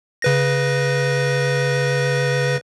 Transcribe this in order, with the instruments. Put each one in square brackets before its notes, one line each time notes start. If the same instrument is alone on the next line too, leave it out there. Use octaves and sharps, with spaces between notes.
[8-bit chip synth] C#3 B4 A#6